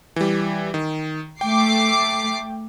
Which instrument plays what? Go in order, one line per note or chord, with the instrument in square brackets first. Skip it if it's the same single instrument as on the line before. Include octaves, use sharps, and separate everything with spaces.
[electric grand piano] E3 G3
D#3
[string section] A3 D6 C7 [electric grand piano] G5